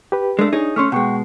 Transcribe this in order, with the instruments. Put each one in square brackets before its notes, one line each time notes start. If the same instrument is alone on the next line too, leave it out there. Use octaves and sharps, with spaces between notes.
[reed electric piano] G4 B4
[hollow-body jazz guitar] G#3 A3 [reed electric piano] D4
[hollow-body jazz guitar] D#4 G#4 C#5
[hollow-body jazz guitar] A3 C#4 [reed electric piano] C6 C#6 F6
[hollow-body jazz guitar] B2 G#3 [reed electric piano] F#5 G5 C#6